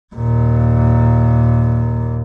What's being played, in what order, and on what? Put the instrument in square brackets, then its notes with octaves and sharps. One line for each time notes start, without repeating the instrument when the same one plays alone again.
[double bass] D#2 A#2